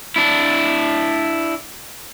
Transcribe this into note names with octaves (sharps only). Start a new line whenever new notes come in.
D4 E4